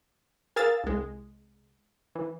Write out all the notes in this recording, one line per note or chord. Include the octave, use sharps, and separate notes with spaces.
G#4 A#4 F5 E6 A6
C2 G#3
E3